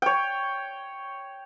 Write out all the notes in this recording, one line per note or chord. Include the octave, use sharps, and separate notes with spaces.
C#5 G5